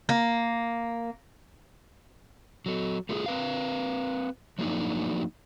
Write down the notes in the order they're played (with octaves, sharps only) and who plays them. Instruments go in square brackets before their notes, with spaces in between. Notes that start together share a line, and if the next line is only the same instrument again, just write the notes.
[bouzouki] A#3
[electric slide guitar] F#3 A4
A3 F4 G4 G#4
C4 B4 F5
F3 F#3 A3 A#3 D4 D#4